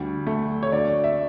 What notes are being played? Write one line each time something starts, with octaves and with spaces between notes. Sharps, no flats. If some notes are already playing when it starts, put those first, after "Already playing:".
Already playing: D2 G3
A3
C#5
D2 D5
E5